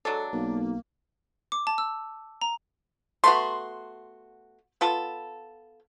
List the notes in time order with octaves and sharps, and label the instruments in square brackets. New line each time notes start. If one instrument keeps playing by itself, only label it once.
[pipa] F#3 G#3 D4 [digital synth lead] A4
[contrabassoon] B1 [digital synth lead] A#3
[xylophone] D6
A5
E6
A#5
[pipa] A3 B3 F#4 [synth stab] C6
[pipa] B3 F4 A4